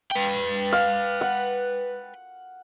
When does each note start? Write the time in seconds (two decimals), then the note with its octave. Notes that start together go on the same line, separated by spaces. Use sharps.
0.11 B4 G5
0.73 F5
1.21 F#5